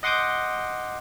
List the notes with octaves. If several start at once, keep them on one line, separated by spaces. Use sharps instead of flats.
D#5 F#5 C6 D6 D#6 G6